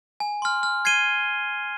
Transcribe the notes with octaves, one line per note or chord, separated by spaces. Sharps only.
G#5
C6 F6
F6
G#6 C7 D#7 G7